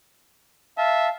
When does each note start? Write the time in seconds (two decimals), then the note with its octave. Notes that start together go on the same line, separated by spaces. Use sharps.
0.78 E5 F5 A5